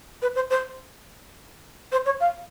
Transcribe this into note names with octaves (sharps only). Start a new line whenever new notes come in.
B4
C5
C5
C5
C#5
F5